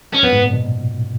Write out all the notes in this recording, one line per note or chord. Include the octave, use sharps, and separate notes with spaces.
C#4
F#2 B3
G#2
A#2
B2